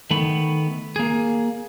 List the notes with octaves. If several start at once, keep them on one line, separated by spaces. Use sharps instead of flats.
D#3 A3 B3 B5
A#3 G#4